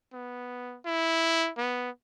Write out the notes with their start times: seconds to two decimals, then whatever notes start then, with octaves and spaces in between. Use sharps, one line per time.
0.13 B3
0.85 E4
1.58 B3